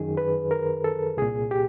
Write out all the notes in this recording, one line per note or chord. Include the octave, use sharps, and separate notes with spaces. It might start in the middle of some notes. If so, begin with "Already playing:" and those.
Already playing: F#2 D#3 G#4
B4
A#4
A4
C2 A#2 G#4
G4